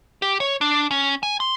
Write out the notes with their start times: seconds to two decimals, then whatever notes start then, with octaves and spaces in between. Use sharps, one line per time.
0.22 G4
0.40 C#5
0.61 D4
0.91 C#4
1.23 G#5
1.40 C6